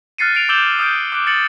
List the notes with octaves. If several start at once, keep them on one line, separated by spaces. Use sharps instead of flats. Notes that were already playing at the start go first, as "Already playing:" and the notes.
F6 F#6 A6 C7 C#7 D#7
C7 D7 F7
D6 E6 G6 E7 F#7 G7
D#6 F6 G6 D7
D6 F#6 D7
A6 C#7 F#7